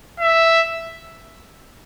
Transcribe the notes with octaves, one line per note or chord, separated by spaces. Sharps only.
E5